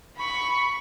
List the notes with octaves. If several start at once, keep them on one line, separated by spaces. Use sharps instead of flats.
B5 C#6